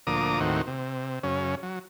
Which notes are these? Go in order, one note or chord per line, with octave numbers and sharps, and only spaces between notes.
D2 A#2 F3 A#5 D6 D#6
D#2 A2 D#3 C4 F#4
C3
F#2 C#3 C#4
F#3